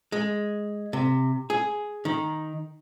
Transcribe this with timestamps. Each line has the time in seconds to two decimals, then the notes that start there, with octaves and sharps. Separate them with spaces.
0.12 G#3
0.93 C3
1.50 G#4
2.05 D#3